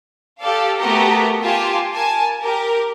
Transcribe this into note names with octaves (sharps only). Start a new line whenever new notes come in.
G4 A4 D5 F5
A3 B3 F#4 G4 A#4 A#5
F4 G4 G#5 A5
A#4 G#5 A5
G4 A#4